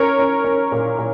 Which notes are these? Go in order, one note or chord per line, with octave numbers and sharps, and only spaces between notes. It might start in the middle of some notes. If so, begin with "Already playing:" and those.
Already playing: C#4 A#4 C#5
C#4
C#4
A#2
A#2